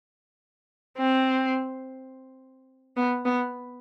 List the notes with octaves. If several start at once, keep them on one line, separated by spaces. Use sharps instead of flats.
C4
B3
B3